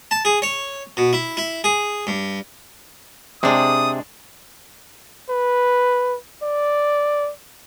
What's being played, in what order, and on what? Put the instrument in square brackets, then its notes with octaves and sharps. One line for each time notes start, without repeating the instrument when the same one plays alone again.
[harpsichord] A5
G#4
C#5
B2
E4
E4
G#4
G2
[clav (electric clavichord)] C3 [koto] G#3 D4 [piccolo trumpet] D#6
[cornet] B4
D5